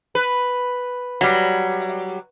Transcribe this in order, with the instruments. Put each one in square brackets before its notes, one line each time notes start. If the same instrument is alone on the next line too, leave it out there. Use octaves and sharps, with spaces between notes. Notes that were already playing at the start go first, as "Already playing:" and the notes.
[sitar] B4
[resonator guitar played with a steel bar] F#3 G3